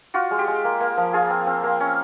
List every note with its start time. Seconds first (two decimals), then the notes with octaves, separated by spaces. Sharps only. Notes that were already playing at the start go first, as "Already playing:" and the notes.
0.14 F4 F#4
0.31 G#3
0.39 G4
0.47 G#3
0.64 A#3
0.81 A#3
0.97 F3
1.13 F4 G#4
1.30 C4
1.47 C4
1.64 A#3
1.80 C#4